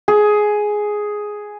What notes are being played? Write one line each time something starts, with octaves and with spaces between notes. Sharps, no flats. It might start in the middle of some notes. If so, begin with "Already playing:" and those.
G#4